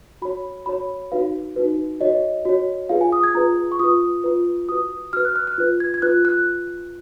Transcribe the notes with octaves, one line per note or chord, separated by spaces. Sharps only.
F#4 C#5 B5
F#4 C#5 B5
D#4 F#4 B4 F5
D#4 F#4 B4
F#4 C#5 D#5
F#4 C#5
F4 G#4 B4 F5
G#5
D#6
G#6
F4 G#4 B4 A#5
C#6
F4 B4 D#6
F4 B4
F#4 B4 D#6
F#4 B4 F6
F#6
F6
F#6
F4 B4
G#6
G#6
F4 B4 F#6
F#6